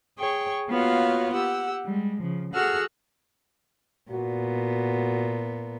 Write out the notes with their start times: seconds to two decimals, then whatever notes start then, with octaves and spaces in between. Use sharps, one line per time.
0.19 G#4 C#5 G5 C#6
0.69 A#3 B3 F4 F#4 C#5 F5
1.33 G4 F#5 E6
1.84 G3 G#3
2.20 C#3 F3
2.53 F#4 G#4 A4 F#5 E6 F6
4.11 A#2 B3 F#4